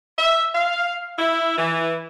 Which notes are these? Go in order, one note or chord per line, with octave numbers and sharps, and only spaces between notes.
E5
F5
E4
E3